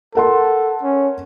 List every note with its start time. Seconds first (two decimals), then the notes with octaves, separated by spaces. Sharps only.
0.15 A4 A#4 F#5 C6
0.83 C#4